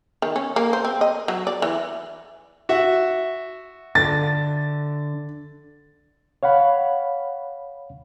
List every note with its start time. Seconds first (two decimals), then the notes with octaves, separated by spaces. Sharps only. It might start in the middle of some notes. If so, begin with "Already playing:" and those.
0.22 D#3
0.36 C#4
0.56 A#3
0.73 C5
0.85 C4
1.01 D#5
1.28 F#3
1.47 D5
1.62 E3
2.69 F#4 E5
3.95 D3 A6
6.43 C#5 F5 F#5 B5